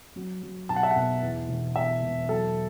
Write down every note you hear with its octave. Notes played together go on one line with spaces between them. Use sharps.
F#3
F#3
B1 A5
F#5
E5
F#5
B2
E2
E1
B2 E5
E1
F#3 A4